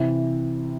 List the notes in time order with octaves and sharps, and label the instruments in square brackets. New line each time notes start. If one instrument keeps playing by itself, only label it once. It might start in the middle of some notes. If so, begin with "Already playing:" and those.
Already playing: [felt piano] C3 E3